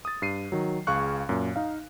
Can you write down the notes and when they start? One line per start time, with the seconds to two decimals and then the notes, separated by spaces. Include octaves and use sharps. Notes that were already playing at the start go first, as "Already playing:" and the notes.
0.05 D#6 A6
0.22 G2 C7 D#7
0.52 D#3 F#3
0.87 C#2 G#4 F5 C#6 F#6
1.29 F#2 A#2
1.56 D#4 F5